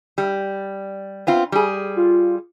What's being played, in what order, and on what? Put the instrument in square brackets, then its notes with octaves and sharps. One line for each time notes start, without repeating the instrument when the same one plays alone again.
[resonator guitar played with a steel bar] G3
B3 C4 F4
G3 G#4
[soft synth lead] F4